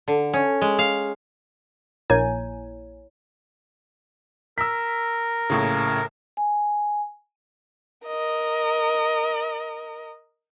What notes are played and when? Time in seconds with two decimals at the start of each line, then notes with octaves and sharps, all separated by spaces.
0.08 D3
0.33 C#4
0.62 G#3
0.79 F5
2.10 A#1 A#3 E4 C#5 G#5
4.58 A#4 E6 B6
5.50 A#1 A2 C#3
6.37 G#5
8.06 A#4 D#5